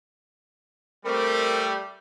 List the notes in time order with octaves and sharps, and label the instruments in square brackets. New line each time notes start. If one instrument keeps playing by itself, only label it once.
[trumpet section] G3 A3 [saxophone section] C4 A#4